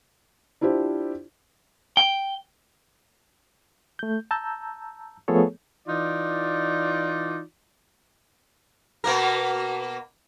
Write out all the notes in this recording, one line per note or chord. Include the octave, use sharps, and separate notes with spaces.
D4 E4 F4 G4 C5
G5
A3 G6
A5 A#5 E6 G6
F3 A3 B3 G#4 A4 C#5
E3 D#4 F4 D5
B2 A#3 A#4